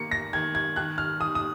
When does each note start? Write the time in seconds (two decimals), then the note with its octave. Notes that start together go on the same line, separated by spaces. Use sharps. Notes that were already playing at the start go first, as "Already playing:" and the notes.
Already playing: D#3 A#3 C#7
0.11 A#6
0.33 D#3 G#6
0.55 G#6
0.76 D#3 F#6
0.98 F6
1.20 D#3 D#6
1.35 D#6